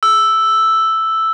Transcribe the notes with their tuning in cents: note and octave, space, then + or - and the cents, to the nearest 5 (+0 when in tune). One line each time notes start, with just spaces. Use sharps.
E6 +0